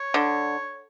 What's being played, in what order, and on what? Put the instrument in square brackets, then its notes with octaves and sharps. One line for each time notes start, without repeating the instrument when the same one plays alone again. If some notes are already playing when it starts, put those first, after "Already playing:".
Already playing: [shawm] C#5
[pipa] D3